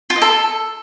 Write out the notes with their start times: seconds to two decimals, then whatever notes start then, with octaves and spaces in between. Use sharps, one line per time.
0.10 F4
0.16 D#5
0.22 A4